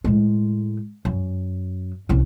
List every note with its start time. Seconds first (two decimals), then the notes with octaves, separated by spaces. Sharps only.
0.04 A2 G#3
1.05 F#2
2.09 C2 C#4